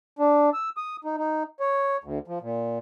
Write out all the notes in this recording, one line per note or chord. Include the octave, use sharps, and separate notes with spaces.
D4
E6
D#6
D#4
D#4
C#5
D2
F3
A#2